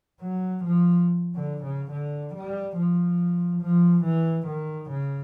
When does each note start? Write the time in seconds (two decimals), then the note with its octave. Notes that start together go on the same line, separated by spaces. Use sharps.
0.21 F#3
0.64 F3
1.35 D3
1.63 C#3
1.91 D3
2.35 G3
2.77 F3
3.62 F3
4.04 E3
4.47 D#3
4.90 C#3